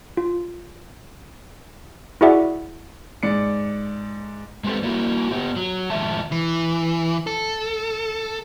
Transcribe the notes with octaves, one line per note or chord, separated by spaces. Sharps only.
F4
E4 F#4 G#4 D5 E5 F#5
G#2 D5 C#7
G#3 B3 C4 G4 A4
A#3 E4 F#4
B3 G4
F#3
A2 D#3 F3 G#3 E5 A5
E3
A4